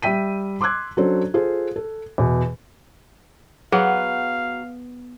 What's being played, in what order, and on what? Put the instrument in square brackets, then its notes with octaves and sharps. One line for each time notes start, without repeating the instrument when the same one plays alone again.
[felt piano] G3 E5 G5 B6 D#7
C6 D6 E6 F#6 G#6
F#3 C#4 D4 A4 C5
F4 G#4 A4 C5
A4
E2 B2
[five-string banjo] F#3 [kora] B3 [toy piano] G#4 [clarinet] F5